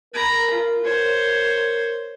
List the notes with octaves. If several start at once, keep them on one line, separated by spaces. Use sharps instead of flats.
A#4 A#5 B5
F4
C5 C#5